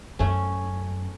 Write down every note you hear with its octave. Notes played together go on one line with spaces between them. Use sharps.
F#2 A3 C#4